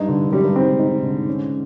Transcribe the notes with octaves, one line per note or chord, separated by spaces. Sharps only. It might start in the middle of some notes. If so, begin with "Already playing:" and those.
Already playing: G2 D#4
D3
F#2 G3
G2
G#2 C4
D#4
D3
C#4